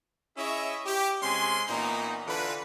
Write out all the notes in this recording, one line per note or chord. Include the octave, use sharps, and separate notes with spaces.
C#4 E4 G#4 C#5 D#5 E5
G4
C3 G#3 C#4 G#5 C6
A#2 E3 B3 C#4 D#4
D3 E3 F4 B4